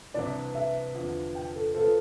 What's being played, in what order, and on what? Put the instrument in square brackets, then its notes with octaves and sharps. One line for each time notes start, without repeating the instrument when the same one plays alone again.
[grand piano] C2 C3 E3 B3 D4 [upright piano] D5
[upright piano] E5
[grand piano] E2 D3 F3
[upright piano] G5
A4
[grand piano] F3 B3 F4 C5 [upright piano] A4